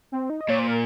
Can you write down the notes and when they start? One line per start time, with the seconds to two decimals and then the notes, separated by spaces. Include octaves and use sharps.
0.12 C4
0.30 D#4
0.41 D#5
0.49 A#2 C#5
0.59 C5
0.67 A#4